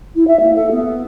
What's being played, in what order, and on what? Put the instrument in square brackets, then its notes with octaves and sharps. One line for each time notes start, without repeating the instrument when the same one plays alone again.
[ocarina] E4
E5
A#3
A4
B3